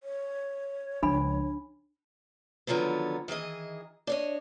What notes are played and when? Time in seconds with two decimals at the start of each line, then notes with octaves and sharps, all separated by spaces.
0.03 C#5
1.03 C#2 F3 D4 G#5 B5
2.67 D3 D#3 F3 F#3 B3
3.28 D#3 E3 G#4 D#5
4.07 D4 C#5 D#5